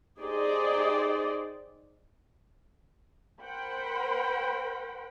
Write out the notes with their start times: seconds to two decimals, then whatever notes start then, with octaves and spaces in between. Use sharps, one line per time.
0.20 D#4 G4 G#4 C5 D5 D#5
3.42 A#4 C5 F#5 G5 B5